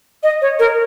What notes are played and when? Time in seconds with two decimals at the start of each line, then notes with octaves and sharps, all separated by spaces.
0.23 D#5
0.42 C#5
0.59 A#4